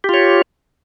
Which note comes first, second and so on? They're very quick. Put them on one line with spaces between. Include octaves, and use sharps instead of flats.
G4 F4 C#5